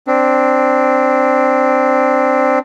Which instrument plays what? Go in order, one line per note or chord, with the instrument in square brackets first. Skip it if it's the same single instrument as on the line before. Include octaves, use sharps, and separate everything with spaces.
[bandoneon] C4 D4